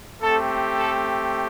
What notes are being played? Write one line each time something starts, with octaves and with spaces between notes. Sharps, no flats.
A3 C4 G4 A4
A4